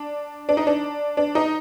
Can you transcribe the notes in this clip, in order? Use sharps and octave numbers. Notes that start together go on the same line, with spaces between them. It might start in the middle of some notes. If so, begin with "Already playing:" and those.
Already playing: D4
D4
D#4
D4
D4
D#4